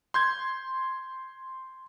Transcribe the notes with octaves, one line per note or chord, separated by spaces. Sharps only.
C6 G6 G#6